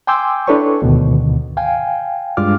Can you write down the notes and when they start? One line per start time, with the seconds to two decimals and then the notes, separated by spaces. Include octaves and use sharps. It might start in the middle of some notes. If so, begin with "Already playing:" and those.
0.07 G5 G#5 C6 D6 E6 G6
0.47 D4 E4 A4 B4 C#5 C#6
0.82 D2 G#2 B2 D3 D#3
1.57 F5 G5 G#5
2.37 G2 G#3 D4 F4 D6 F6